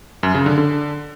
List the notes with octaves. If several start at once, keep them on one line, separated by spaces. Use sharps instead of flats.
F#2
C#3
D3
D3